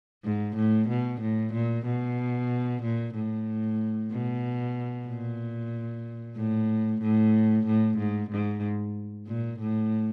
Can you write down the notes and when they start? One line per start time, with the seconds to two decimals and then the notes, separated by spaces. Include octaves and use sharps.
0.24 G#2
0.56 A2
0.88 B2
1.21 A2
1.53 A#2
1.85 B2
2.82 A#2
3.15 A2
4.11 B2
5.07 A#2
6.36 A2
7.02 A2
7.66 A2
7.98 G#2
8.30 G#2
9.27 A#2
9.59 A2